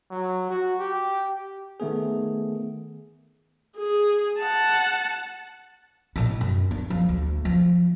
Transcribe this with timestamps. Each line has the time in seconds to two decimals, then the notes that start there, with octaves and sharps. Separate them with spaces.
0.10 F#3
0.50 F#4
0.80 G4
1.80 D#3 A3 B3 G#4
3.78 G#4
4.39 F#5 A5
6.16 A2 D#4
6.41 F#2
6.71 D4
6.90 F3
7.09 D2
7.45 F3